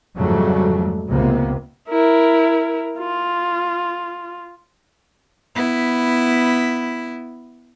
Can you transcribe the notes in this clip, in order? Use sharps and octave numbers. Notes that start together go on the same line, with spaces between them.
F2 G#2 C#3 F#3 G3 A3
C#2 C3 A#3 B3
E4 A#4
F4
B3 E4